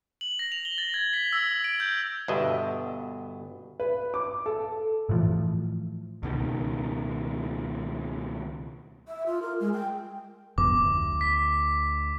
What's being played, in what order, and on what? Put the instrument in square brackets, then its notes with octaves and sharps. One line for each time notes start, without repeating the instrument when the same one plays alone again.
[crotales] F#7
A#6
F7
G7
A6
G#6
B6
E6
D7
G6
[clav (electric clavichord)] G1 B2 B3 D4 D#5 E5
[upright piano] B4
D6
A4
[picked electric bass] A2 E3 F3
C#2 B2 D#3
[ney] E5
F4
A#4
G#3
G5
[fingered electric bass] G1 F2 B3 [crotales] D6
[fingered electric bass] D2
[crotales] B6